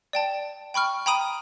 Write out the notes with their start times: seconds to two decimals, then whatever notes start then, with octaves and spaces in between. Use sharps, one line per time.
0.13 D5 G5 A5
0.74 G5 B5 C#6 F6
1.06 G5 A#5 B5 D#6 D#7